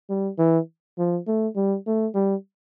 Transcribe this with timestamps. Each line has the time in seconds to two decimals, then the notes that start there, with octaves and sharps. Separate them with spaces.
0.09 G3
0.38 E3
0.98 F3
1.27 A3
1.56 G3
1.86 A3
2.15 G3